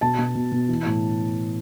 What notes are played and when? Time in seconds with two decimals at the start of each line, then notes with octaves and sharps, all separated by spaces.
0.01 B2 A5
0.19 B2
0.35 B2
0.52 B2
0.69 E3
0.85 A2